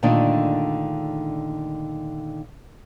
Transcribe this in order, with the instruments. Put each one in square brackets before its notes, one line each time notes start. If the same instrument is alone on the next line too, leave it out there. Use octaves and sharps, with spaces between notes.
[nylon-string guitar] A#2 D3 D#3 G#3 A3 D4